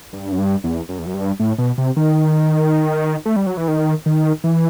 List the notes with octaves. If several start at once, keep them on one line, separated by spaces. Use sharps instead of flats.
G2
F#2
G2
E2
F#2
E2
F#2
G2
A2
B2
C3
D#3
A3
G3
F#3
E3
D#3
D#3
E3